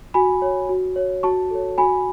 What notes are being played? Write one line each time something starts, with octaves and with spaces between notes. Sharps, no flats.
F#4 G#5 B5
C#5
F#4
C#5
F#4 A5 C#6
A4 C#5
F#4 G#5 B5